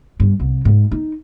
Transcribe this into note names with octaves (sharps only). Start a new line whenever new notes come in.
G2
C2
G#2
D#4